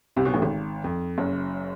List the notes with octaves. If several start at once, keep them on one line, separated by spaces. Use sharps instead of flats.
C2 C3
B1 B2
A1 A2
G#1 G#2
F2
F#1 F#2